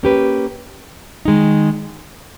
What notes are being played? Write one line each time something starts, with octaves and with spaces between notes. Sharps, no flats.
A#3 C#4 G4 B4
D#3 G#3 D#4